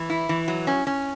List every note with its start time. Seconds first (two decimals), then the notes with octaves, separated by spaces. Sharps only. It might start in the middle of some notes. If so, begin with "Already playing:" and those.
Already playing: E3
0.10 E4
0.29 E3
0.48 F#3
0.67 C#4
0.87 C#4